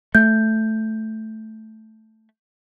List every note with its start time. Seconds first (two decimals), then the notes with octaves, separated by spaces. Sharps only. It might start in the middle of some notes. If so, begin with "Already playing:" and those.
0.15 A3 G6